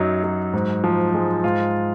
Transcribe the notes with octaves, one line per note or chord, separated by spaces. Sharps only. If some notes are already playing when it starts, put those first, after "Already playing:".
Already playing: F#2 F#3 D#4
F#3
G#2
F3
G#3
G#2 F4